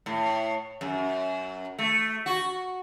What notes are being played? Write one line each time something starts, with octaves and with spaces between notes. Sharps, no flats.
A2
F#2
A3
F#4